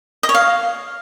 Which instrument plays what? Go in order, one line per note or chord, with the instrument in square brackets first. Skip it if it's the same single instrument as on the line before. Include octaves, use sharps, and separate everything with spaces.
[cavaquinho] D#5
C#5
F5